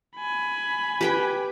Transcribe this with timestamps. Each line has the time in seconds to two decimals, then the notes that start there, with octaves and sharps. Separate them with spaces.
0.17 G#5 B5
1.01 G4 B4 G5